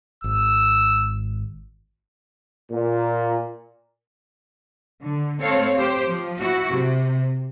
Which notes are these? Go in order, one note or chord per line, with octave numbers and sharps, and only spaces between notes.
G#1 E6
A#2
D3
A3 C4 A4 C#5 F5
G4 C5
F3
E4 F#4
C3